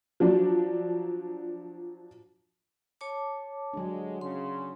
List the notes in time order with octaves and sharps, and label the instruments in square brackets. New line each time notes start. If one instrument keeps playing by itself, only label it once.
[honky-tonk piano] F3 F#3 D4
[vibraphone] C#5 A5 D6
[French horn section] G2 D3 G#3 [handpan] F#3 D4
[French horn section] C#3 [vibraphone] C6